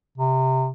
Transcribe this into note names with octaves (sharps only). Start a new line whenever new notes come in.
C3